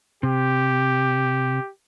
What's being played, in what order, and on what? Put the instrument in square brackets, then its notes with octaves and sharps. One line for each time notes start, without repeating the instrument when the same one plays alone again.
[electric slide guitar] C3 [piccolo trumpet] G4